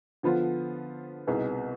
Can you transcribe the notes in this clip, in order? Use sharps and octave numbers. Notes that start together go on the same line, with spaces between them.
D3 F3 B3 F4
C2 B2 B3 D#4 G#4